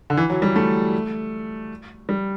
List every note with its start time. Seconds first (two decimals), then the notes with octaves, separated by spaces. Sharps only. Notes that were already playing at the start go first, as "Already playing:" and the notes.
0.10 D3
0.17 E3
0.30 F#3
0.42 G3
0.56 A3
2.09 G3